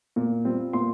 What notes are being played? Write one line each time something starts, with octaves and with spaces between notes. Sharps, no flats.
A#2
G3 C4 F4
A#2 C6